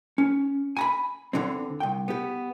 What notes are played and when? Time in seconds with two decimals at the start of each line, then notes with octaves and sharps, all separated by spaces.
0.18 C#4
0.77 G#5 A#5 B5
1.33 E2 D3 E3 C4
1.80 C2 G5
2.08 B3 G4